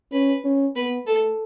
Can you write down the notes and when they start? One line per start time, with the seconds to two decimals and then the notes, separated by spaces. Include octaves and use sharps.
0.12 C#4 B4
0.44 C#4
0.76 B3 B4
1.06 A3 A4